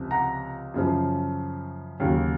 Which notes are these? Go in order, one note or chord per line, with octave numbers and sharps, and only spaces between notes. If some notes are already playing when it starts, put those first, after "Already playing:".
Already playing: C#2 C3 F3
F#5 A#5
F#2 C#3 F3
D#2 C#3 F#3